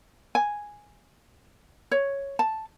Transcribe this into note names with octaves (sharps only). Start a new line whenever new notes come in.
G#5
C#5
A5